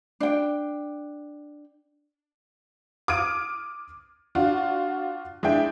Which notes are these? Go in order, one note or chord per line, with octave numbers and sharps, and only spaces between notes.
D4 G5
D6 D#6 F6 G#6 D7 D#7
D4 F4 F#4
G#3 D4 E4 G5